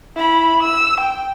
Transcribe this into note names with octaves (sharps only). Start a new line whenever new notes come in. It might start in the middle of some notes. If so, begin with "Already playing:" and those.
E4 B5
E6
G5